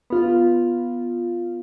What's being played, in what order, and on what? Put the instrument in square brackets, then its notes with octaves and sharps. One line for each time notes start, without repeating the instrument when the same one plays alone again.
[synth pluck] B3 F4